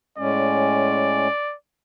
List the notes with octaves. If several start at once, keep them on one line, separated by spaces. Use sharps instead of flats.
A2 G#3 C#4 D5